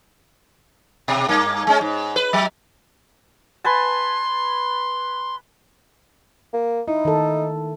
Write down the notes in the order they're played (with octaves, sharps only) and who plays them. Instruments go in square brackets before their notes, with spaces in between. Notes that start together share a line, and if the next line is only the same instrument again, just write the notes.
[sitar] B2
G2 A#3
G#3 C#4
G#2
B4
F#3
[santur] B4 G#5 A5 [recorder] C6
[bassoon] A#3
[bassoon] D#4 [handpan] E4
[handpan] D#3 A4